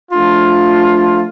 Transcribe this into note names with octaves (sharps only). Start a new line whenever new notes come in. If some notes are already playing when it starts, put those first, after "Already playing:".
F3 A3 D4 F4